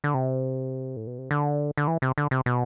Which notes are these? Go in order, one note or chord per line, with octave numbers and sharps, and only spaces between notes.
D3
C3
A2
B2
C3
D3
D3
E3
C3
D3
C3
B2